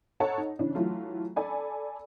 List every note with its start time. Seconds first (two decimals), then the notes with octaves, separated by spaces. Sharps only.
0.20 A4 C#5 D#5 F#5 A5 A#5
0.38 D#4
0.59 C#3 E3 D4 C#5
0.75 E3 F#3 A3 F4
1.36 A4 D5 G#5 B5